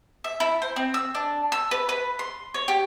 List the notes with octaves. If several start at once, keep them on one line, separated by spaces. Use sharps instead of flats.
E5
E4
C5
C4
E6
D4
E6
B4
B4
C6
C#5
G4